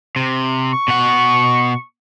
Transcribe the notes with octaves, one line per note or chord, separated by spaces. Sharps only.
C3
C#6
B2 F#5